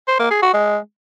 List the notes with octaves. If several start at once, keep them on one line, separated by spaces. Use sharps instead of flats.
C5
A#3
G#4
F#4
G#3